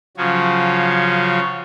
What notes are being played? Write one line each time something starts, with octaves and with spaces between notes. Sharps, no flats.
C#3 F3 F#3 C#4